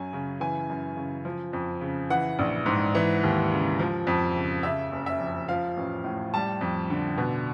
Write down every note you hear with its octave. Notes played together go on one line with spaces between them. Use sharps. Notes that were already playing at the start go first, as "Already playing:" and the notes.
Already playing: F#2 F#3 G#5
C#3
E3 G#5
F#2
C#3
F3
F2
C#3
E3 F#5
A#1
G#2
E3
D#2
C#3
F3
F2
C#3
C#3 E5
F#1
E5
F2
F3 F5
A1
A2
G3 A5
F2
D3
B2